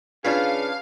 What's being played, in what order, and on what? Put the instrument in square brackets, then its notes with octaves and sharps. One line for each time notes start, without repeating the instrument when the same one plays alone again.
[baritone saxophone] C#3 [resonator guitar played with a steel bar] D4 F4 B4 [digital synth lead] F5